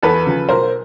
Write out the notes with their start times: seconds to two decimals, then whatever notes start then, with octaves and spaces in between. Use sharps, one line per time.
0.02 E2 A4 B4
0.26 C#3 F3
0.49 B1 A#4 C5